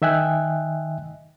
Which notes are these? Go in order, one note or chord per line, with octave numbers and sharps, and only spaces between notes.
D#3 D#5 E5 G5 G#5 F#6